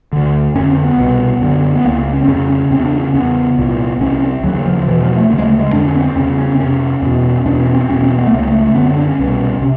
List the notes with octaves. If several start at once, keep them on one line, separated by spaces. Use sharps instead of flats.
D2 D3
F2 D3 C#4
C4
B3
C2 B2
F#2 D3
B3
C#2 C#3 A#3
C#4
C4
F2 C#3 C#4
C#4
E2 C#3 C4
D4
C#4
E2 C#3 B3
C2 A#2
C2 C3 C#4
C4
D#2 C#3 F#3
F3
E2 B2 E3
F3
A3
D2 C#3 G#3 A#3
A3
G#3
F2 D3 D4
C#4
B3
C4
E2 C#3 C#4
C#4
C4
F2 C3 C#4
E2 B2
E2 B2 D4
C#4
C4
E2 B2 C#4
C4
B3
A3
C#2 C#3 A#3
A3
A3
F#2 D3 B3
C4
D4
C#4
C2 B2
C3